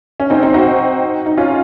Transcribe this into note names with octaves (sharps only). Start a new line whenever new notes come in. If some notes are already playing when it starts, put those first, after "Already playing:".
C#4
C4 D#4
C4 D#4
D#4 F#4
D#4
C#4 F4